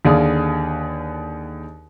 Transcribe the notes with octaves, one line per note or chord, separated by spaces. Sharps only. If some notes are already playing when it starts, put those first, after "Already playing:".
D#2 D3 G#4 D5 F5 D#6